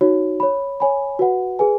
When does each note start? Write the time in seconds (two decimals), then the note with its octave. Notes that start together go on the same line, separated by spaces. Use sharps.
0.01 D#4 F#4 C#5
0.40 C#5 B5
0.80 C#5 G#5 B5
1.19 F#4 B4 F#5
1.59 G#4 B4 G#5